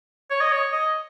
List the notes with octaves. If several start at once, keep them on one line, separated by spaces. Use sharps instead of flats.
C#5
D#5
C#5
D#5